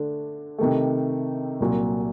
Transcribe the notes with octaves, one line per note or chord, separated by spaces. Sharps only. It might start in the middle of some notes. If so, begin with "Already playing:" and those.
Already playing: D3 A3 D4
C3 D#3 A3
C2 A#2 F#3